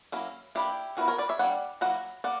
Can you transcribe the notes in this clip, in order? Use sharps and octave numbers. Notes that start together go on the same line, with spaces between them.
F#3 A#3 C#4 E4
E3 A#3 D4 E4 G4
E3 B3 E4 F#4 A#4
A#4 C#5
B4 D5
C#5 E5
G3 A#3 D4 D5 F#5
F#3 A#3 E4 F#5 A#5
A#3 D5 F#5